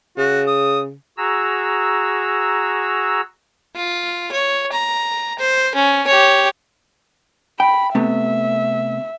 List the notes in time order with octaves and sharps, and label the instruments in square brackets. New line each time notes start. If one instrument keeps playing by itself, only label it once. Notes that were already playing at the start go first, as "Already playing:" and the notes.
[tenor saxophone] C#3 [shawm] F#4
[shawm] D#6
[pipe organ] F#4 G#4 A#5 E6
[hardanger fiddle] F4
C#5
A#5
C5
C#4
G4 C#5
[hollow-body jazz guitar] G5 [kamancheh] B5
[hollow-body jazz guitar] C3 A3 B3 [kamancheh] E5